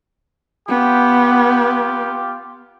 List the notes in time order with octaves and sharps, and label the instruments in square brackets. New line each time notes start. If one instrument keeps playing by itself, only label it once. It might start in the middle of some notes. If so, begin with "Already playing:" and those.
[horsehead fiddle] B3 [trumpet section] F4 G4